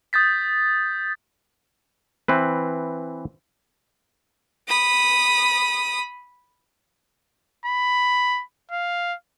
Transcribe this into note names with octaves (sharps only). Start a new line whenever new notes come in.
D#6 G6 A6 B6
E3 C4 B4
B5 D#6
B5
F5